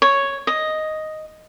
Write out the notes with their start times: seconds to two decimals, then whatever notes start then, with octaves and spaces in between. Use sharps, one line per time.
0.02 C#5
0.47 D#5